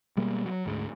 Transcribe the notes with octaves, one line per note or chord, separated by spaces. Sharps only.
B2 G3 G#3 A#3
F#3
D2 G#2 G#3